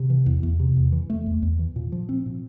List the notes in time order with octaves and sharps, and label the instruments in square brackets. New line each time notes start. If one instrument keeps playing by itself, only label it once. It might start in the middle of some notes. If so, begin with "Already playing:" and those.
Already playing: [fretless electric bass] C3
E3
E2
E2
C3
E2
E3
A3
E2
E2
E3
A#2
F3
C4
A#2